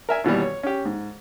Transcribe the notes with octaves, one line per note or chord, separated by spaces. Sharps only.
A#4 E5 G#5
D#2 B2 E3 G3
C#5
C#4 G4
G#2